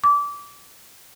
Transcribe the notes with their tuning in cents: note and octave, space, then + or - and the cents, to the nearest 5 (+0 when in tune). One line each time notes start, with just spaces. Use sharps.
D6 -25